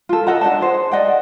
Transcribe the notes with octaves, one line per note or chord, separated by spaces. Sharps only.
F4 A4
A4 D#5 F#5 A#5
D4 C5 D#5 A5
G#4 C5
D5 D#5 F#5 G5